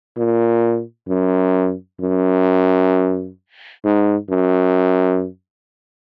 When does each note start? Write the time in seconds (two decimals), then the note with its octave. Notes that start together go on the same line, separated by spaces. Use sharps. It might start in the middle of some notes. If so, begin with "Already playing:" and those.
0.17 A#2
1.08 F#2
2.01 F#2
3.84 G#2
4.30 F#2